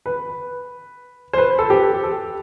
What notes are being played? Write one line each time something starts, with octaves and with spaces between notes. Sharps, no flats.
B4
C5
B4
A4
G4
A4